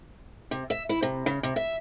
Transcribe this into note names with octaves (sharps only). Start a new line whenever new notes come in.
C3
E5
E4
C3
C#3
C3
E5